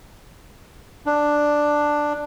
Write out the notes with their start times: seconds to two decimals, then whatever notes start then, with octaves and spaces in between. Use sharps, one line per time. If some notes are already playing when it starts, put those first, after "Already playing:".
1.06 D4